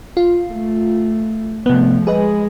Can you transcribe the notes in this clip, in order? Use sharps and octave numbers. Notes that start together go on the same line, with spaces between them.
F4
A3
C3 F3 A3 B3
G#3 G#4 B4 D#5